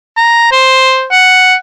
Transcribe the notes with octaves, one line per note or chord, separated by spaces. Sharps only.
A#5
C5
F#5